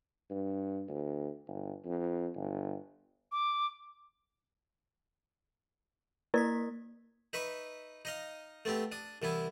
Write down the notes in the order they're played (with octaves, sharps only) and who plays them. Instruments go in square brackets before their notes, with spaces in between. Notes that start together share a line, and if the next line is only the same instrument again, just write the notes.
[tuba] G2
D2
G1
F2
G1
[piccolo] D6
[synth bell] A#3 D#6 B6 [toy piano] E4 A#4 D5
[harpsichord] D#4 B4 E5 C#6
D#4 D#5 F5
A3 B3 C4 G4
D4 D#6
C2 E3 B3 E4